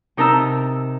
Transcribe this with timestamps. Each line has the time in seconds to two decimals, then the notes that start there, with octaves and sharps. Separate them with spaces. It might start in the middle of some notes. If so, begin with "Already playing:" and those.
0.17 C3 D#4 A#4 A5 A#5 E6